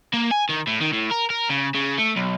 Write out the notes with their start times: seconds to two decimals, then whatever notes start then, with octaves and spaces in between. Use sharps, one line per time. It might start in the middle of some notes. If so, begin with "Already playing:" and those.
0.14 A#3
0.31 G#5
0.49 D#3
0.67 A2
0.81 D#3
0.93 A2
1.11 A#4
1.30 A#4
1.50 C#3
1.75 C#3
1.99 A3
2.16 B1